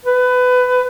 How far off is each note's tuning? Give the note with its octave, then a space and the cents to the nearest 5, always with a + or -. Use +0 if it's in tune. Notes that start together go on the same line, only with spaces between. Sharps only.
B4 +20